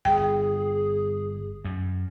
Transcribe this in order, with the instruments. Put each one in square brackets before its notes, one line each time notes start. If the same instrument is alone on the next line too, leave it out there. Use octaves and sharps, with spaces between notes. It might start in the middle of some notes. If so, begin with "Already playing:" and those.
[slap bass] G1 [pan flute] G#4 [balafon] G5
[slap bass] F#2